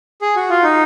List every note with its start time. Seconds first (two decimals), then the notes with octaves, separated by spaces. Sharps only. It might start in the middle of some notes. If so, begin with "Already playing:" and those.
0.22 G#4
0.36 F#4
0.50 F4
0.63 D#4